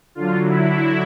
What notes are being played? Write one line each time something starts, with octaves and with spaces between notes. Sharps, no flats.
D3 F#3 F4
E4